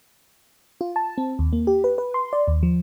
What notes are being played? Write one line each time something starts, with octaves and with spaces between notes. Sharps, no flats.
F4
A5
C4
D#2
A#3
G4
B4
B4
C6
D5
D#2
F3